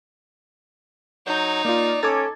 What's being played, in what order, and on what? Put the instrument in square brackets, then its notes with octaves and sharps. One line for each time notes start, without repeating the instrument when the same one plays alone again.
[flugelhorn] F#3 [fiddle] D#4 [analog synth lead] G6
[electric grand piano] A#3 F4 [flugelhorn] D5
[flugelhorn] C#4 [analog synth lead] A4 [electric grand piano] D6 G#6 A6